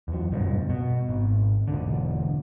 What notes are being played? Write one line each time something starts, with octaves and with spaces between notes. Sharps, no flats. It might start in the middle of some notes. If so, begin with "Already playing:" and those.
E2 F#3
F#1 G2 B2
B2
G#1
E1 D3